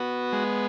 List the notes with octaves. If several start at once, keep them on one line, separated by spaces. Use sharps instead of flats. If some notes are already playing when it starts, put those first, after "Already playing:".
Already playing: B3 F#4
G#3